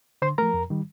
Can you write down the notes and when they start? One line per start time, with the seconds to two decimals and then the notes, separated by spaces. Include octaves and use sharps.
0.22 D3 C5 C6
0.38 F3 A3 A#4 A#5
0.54 F2
0.70 D#3 G3